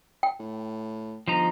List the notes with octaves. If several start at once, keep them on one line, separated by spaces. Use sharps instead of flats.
G5
A2
G1 F3 D#4 A#5